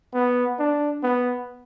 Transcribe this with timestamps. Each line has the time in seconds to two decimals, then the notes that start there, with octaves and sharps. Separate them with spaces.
0.14 B3
0.59 D4
1.03 B3